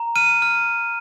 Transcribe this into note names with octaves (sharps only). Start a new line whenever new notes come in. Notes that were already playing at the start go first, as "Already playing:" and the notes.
Already playing: A#5
F6 D#7
F6